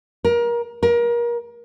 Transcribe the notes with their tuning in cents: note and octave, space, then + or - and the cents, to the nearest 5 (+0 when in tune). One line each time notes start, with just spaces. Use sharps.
A#4 +25
A#4 +30